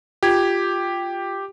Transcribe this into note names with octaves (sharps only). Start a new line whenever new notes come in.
F4 G4 G#6